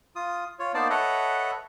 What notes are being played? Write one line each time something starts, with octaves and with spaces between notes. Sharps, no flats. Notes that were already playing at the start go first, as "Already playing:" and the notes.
F4 D#6
F4 C#5
A#3 B3 D#4 C5 D5 A5
A4 B4 C#5 D#5 E5 F#5